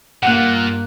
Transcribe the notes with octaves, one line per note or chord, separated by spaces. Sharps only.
G2 A#2 A#3 F#5 F#6